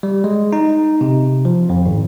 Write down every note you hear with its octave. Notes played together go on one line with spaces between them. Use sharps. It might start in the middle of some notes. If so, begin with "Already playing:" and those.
G3
G#3
D#4
C3
F3
F2
G#1